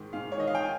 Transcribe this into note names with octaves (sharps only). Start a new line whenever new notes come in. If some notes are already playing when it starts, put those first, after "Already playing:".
Already playing: G#2 D#3
G#2 F5
C#5
D#3 D#5
F5
G5
G#5